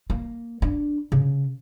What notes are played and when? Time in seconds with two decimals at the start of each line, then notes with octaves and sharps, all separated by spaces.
0.10 A#3
0.62 D4
1.12 C#3